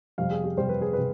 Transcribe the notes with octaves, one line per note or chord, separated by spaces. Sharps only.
F2 C3 G3 F5
G#4
G4
F2 C3 G3 C5
B4
G#4
C3 B4